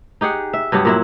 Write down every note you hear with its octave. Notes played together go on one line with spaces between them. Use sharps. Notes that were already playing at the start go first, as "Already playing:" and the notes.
D#4 G4 G#4 F#5
E5
G2 F#3 B3 G4
A#2 F#3 E4